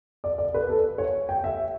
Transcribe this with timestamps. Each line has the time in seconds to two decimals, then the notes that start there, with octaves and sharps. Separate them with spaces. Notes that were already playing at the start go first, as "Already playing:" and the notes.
0.24 D5
0.38 D5
0.54 B4
0.69 A4
0.98 C#5
1.29 G5
1.44 E5